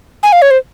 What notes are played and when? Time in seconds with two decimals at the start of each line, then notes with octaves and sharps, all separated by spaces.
0.23 G#5
0.33 F5
0.42 C#5
0.51 C5